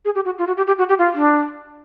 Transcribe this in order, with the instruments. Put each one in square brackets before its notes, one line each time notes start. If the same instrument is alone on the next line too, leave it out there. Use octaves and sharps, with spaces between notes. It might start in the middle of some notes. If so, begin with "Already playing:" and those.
[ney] G#4
G4
F#4
F4
F#4
G4
G4
F#4
G4
F4
D4